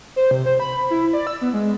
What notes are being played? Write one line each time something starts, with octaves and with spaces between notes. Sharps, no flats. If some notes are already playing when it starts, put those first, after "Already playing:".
C5
C3
C5
B5
E4
D5
E6
B3
G#3